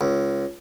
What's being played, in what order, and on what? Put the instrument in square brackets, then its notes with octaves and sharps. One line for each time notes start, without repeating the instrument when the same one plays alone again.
[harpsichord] C#2